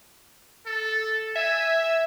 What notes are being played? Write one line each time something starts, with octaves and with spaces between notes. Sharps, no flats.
A4
E5 G#5